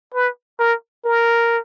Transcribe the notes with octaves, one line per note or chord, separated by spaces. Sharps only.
B4
A#4
A#4